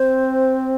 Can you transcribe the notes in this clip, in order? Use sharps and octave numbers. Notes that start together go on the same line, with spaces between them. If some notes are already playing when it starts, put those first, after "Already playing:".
Already playing: C4 C5